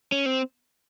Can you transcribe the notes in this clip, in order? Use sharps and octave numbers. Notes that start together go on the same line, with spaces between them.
C#4
C4